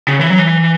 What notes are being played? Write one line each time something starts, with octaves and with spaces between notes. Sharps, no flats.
C#3
E3
F#3
E3